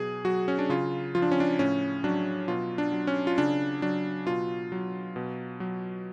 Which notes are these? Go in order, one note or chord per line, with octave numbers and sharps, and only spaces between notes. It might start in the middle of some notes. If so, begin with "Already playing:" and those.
Already playing: B2 F#3 G#4
F#3 F#4
C#4
D4
C#3 F4
F3 F4
D4
C#4
D4
A2 C#4
F#3 D4
B2 F4
D4
F#3
C#4
F4
C#3 D4
F#3 D4
B2 F4
F#3
B2
F#3